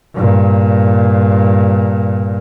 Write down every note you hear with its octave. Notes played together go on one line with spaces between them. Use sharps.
G2 A#2